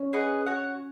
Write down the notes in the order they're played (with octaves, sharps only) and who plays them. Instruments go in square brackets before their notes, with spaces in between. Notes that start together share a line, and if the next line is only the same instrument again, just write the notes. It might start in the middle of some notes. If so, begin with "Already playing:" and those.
Already playing: [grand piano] C#4
[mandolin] G#4 B4 D#5 F#5
F#4 C#5 F#5